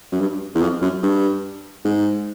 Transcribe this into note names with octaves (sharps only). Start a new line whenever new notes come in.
F#2
G2
E2
F2
F#2
G2
G#2